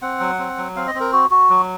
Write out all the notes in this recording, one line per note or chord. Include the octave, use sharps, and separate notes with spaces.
C4 F#5
F#3
C4
F#3
C4 F5
D#5
C4
A#4
F#4
F#4
F#3